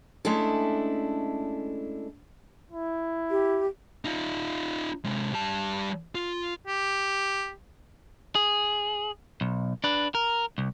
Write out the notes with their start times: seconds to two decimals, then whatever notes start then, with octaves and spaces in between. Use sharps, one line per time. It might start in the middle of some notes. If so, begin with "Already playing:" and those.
0.25 G#3 A3 C#4 D4 E4 A4
2.72 E4
3.30 G4
4.05 D#4 F4
5.04 C3 G#3
5.33 G3 A5
6.15 F4
6.67 G4
8.35 G#4
9.41 B1
9.84 D4 B4
10.15 A#4
10.58 C2